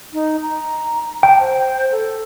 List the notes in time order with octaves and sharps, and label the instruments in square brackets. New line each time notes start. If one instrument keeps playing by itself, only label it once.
[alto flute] D#4
A#5
[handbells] G5 [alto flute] A5
[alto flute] C5
A4